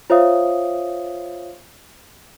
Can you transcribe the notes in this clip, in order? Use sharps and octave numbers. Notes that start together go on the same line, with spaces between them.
F4 C5 C#5 E5 F5 D#6